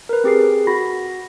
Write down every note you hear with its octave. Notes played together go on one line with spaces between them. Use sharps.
A#4 B4
C4 G4 G#4 C7
F#4 B5 A#6